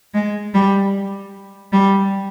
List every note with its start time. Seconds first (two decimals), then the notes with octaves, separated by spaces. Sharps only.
0.14 G#3
0.54 G3
1.72 G3